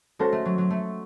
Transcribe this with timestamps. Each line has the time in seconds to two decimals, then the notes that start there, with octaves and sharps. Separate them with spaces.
0.19 G#3 C#4 F#4 A4 C5
0.32 A3
0.45 F#3
0.58 F#3
0.70 A3